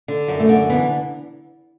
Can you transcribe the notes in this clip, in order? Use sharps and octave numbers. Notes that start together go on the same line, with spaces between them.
D3
F#2
A3
D3
E3 B3